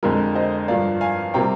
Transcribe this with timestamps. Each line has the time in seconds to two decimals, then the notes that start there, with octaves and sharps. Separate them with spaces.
0.03 F2 D3 G#3 A#4
0.35 C5 D#5
0.68 G2 F3 A#3 D5 F5
1.01 F5 G#5
1.34 C3 G3 A#3 G5 A#5